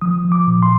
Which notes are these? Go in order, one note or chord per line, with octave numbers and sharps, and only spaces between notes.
F3 D#6
F3
D6
A#2
C6